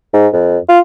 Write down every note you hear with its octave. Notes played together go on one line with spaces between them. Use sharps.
G#2
F2
F4